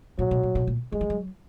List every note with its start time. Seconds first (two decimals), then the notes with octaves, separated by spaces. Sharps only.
0.19 A#2 F#3
0.31 B2
0.43 A#2
0.55 B2
0.67 A#2
0.92 F#3 G#3
1.01 F3
1.10 F#3